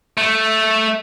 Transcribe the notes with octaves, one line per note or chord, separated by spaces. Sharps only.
A3